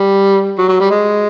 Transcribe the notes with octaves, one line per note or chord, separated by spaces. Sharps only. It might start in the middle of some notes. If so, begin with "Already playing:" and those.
Already playing: G3
F#3
F#3
G3
G#3